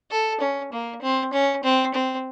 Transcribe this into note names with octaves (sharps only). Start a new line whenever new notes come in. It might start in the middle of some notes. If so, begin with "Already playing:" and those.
A4
C#4
A#3
C4
C#4
C4
C4